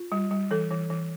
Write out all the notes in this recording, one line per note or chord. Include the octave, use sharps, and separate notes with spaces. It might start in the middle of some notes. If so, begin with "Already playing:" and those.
Already playing: F4
G3
G3
E3 A4
E3
E3